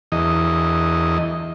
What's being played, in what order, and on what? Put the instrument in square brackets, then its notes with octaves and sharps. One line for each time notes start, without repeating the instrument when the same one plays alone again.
[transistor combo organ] E2 D#5